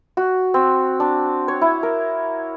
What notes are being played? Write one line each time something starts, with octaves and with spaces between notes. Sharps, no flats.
F#4
C4
D4
C#5
E4
A#4